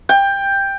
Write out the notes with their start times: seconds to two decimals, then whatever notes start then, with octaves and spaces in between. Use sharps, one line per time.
0.09 G5